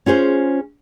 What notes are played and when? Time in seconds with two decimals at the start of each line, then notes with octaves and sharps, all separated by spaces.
0.06 C#4 F4 G#4 C5